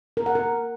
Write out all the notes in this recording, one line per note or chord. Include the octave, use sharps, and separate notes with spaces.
A#4
F#5
A#4